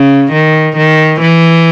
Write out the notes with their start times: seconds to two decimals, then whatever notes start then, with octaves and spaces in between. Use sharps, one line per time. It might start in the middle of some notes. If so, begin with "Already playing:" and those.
Already playing: C#3
0.32 D#3
0.77 D#3
1.21 E3